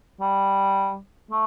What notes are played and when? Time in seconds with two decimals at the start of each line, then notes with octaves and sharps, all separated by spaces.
0.21 G3
1.31 A3